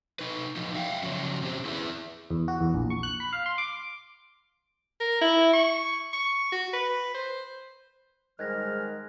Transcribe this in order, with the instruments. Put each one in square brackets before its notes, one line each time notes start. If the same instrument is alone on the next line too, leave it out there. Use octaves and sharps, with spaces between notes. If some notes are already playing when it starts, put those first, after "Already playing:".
[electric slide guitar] D#4 B4
F3 F#3 D#4
E5 F5 G5
C#3 F3 F#3 C#4
C4 C#4 G4 C5
E4 G#4 B4 D#5 E5
[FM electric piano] E2
F#4
E2
A#1
C#6
F#6
B5
F5
C6
D6
[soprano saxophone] A#4
E4
C#6
C#6
F#4
B4
C5
[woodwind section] G#2 G3 F6 [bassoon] D#3 [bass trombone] G#3 [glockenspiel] F#6 G#6 A#6